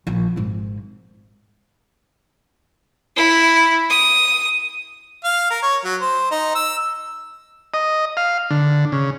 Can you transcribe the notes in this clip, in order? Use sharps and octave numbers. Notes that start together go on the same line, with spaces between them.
A#1
G#1 G#2
E4
D#6
F5
A#4
C#5
F#3
C5
D#4
E6
D#5
F5
D3
C#3